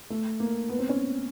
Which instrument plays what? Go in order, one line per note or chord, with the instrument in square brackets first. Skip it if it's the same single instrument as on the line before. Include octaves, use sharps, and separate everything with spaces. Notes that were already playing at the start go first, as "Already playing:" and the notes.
[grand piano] A3
A#3
B3
C4
C#4